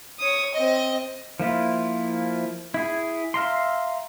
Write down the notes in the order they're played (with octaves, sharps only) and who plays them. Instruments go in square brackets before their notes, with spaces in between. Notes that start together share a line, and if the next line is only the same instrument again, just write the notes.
[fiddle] C#5 D#6
C4 D#5
[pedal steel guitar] F3 A#3 E4 F4
E4 G#4
E5 F5 A#5 C6